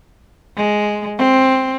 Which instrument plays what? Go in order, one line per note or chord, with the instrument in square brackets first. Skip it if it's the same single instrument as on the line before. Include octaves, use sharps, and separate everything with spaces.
[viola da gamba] G#3
C4